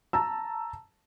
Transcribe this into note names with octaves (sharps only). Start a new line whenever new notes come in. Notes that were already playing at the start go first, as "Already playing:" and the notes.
A5 A#5 E6